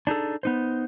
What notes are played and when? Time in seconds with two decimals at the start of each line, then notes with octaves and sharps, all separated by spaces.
0.07 D4 D#4 G#4 A4
0.43 B3 D#4 C5